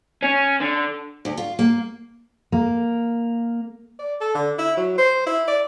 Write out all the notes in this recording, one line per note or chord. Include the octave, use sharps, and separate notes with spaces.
C#4
D3
D2
F4
A#3
A#3
D5
A4
D3
E4
F#3
C5
E4
D5